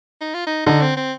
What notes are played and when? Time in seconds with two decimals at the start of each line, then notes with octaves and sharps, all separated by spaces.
0.21 D#4
0.34 F4
0.47 D#4
0.66 D3 D#4
0.81 C4
0.97 C4